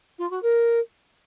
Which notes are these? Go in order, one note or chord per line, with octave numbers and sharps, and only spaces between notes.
F4
F#4
A#4